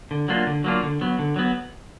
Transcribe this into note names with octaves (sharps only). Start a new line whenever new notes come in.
D3
F#3 A#3 D4 F4
D3
F#3 A#3 D4 F4
D3
F#3 B3
D3
F#3 B3